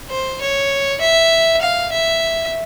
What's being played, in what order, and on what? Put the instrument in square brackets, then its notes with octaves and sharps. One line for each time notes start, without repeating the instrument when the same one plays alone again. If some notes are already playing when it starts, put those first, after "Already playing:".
[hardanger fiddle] C5
C#5
E5
F5
E5